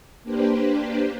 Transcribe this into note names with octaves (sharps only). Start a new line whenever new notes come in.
A#3 D4 G4 B4 C5